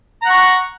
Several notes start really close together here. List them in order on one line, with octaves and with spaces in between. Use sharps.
A#5 F#5 C#6